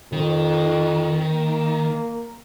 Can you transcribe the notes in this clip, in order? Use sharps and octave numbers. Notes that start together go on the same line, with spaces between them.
F2 D#3
A#3